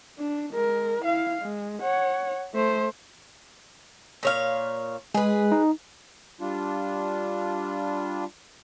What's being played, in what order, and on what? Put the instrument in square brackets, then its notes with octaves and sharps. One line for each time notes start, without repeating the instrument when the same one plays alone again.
[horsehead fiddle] D4
G#3 A#4
E4 F5
G#3
C#5 F#5
A3 C5
[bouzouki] A#2 C#5 F5
[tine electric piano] G#3 [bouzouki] G#4 B4
[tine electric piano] D#4
[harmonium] G3 D4 F4